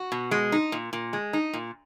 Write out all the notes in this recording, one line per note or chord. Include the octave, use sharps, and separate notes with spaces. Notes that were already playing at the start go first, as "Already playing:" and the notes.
Already playing: F#4
B2
G#3
D#4
A#2
A#2
G#3
D#4
A#2